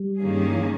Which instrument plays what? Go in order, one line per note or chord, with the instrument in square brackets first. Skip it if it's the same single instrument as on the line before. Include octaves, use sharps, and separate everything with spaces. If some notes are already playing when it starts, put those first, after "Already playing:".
Already playing: [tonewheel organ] G3
[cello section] G2 D#3 A#3 C#4 G#4
[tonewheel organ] E3